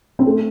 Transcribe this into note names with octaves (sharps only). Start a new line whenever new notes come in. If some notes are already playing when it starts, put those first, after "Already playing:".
C4
A3